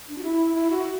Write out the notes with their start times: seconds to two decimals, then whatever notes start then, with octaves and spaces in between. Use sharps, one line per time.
0.09 D4
0.18 F#4
0.23 E4
0.55 E4
0.70 F#4